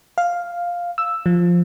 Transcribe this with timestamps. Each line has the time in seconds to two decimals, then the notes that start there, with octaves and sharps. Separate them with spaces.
0.18 F5
0.98 E6
1.26 F3